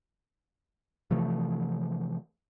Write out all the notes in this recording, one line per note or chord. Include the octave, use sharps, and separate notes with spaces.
C3 E3 F3 A3